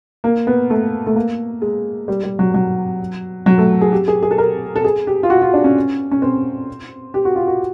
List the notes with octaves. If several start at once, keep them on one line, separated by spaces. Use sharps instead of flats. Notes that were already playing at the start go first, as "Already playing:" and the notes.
A#3
B3
A3
A3
A#3
G#3
G3
G3
F#3
F#3
F#3
A3
G#4
G4
G#4
G#4
A4
A#4
A4
G#4
G4
F4
F#4
F4
D4
C#4
C#4
C4
G4
F#4
F4
F#4